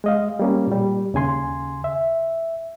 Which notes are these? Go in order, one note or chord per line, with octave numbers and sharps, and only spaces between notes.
G#3 D#5 F5
G3 A#3 C#4
A#2 G3
D#2 C#3 G#5 C6
E5